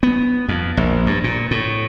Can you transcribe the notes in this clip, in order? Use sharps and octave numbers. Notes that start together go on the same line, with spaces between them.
B3
F2
A#1
G2
A#2
A2